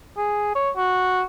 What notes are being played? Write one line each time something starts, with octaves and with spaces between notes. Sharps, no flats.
G#4
C#5
F#4